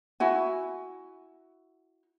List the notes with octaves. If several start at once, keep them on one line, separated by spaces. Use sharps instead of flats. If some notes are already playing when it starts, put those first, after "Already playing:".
E4 F#4 G#5